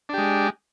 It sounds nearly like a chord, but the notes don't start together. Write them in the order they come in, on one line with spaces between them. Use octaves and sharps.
D4 G4 G#3